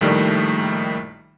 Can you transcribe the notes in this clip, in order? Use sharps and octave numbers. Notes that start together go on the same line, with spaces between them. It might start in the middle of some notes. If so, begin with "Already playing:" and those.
A#1 A2 D#3 G3 A3